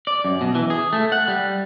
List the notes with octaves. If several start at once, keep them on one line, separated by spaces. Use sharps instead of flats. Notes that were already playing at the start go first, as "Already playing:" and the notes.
D5
F#2
B2
E3
G#4
A3
F#5
G3